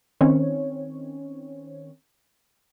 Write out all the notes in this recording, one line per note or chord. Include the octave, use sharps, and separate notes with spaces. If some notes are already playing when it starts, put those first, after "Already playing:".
D#3 C4 C#4 C#5